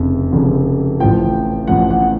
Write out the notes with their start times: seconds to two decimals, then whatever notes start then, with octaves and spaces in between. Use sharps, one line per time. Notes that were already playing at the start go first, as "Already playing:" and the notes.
Already playing: F1 F2 C#3
0.33 F1 F2 C#3
1.00 A1 A2 F3 G5
1.68 A1 A2 F3 F#5
1.91 F#5